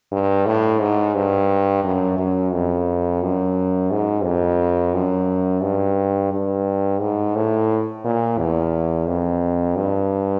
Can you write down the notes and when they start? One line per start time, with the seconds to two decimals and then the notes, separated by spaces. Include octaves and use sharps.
0.12 G2
0.46 A2
0.81 G#2
1.15 G2
1.84 F#2
2.18 F#2
2.53 F2
3.22 F#2
3.91 G#2
4.24 F2
4.94 F#2
5.63 G2
6.32 G2
7.00 G#2
7.36 A2
8.04 A#2
8.38 E2
9.07 F2
9.76 G2